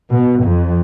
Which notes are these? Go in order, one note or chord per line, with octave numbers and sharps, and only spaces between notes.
B2
F2